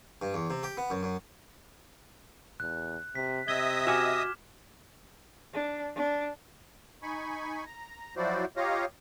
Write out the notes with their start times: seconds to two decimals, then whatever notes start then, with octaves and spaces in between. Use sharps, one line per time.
0.22 G2
0.34 E2
0.50 C3
0.63 G4
0.77 B3
0.90 F#2
1.03 F#2
2.60 E2 F#6
3.15 C3 B6
3.48 C3 D#5 E5 D#6 G#6 G7
3.87 F#4 F#5 G#5 D6 F6 E7
5.54 D4
5.95 D4
7.03 D#4 G#5 B5 C#6
7.66 A#5
8.17 F3 F#3 E4 F#4 C5 D5
8.57 F4 G4 C#5 D#5 F5 A#5